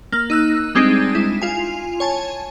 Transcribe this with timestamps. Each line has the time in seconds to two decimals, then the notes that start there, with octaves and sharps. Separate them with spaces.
0.12 A#3 F6
0.30 D#4 E6 F#6
0.75 G3 G#3 C4 D4 D#4
1.15 E4
1.42 F4 G#5
2.00 C#5 G#5 A5